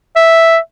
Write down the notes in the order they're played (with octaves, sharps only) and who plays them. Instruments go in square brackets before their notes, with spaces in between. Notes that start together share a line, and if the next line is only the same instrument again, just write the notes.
[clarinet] E5